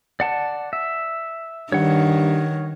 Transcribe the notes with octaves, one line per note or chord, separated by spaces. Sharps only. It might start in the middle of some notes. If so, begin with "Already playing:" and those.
D5 F#5 A5
E5
G2 D#3 C#5 F#5